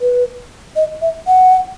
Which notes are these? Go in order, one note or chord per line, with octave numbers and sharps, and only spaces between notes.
B4
D#5
E5
F#5